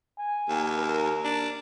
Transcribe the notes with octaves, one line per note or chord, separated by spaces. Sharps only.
G#5
D#2
A#4
D4